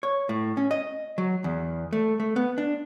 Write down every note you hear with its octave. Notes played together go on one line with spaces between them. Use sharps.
C#5
A2
C#4
D#5
F#3
E2
A3
A3
B3
D4